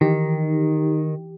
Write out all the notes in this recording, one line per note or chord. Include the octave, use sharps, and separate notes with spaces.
D#3 E3 D#4 G4